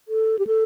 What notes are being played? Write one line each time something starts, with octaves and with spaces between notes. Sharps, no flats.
A4
G4
A4